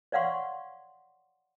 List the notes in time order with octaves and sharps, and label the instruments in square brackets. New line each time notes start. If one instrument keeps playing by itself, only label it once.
[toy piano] C#5 D5 F5 F#5 C6 C#6